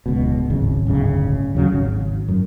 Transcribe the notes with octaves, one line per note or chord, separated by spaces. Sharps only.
D1 C#2 B2
D1 G#1 C#3
D1 G1 C#3
D#2 C#3 F#3
G#1
F#2